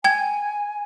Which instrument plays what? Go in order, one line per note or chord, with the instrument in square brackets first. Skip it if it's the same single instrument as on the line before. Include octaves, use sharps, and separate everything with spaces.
[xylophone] G5 G#6 [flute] G#5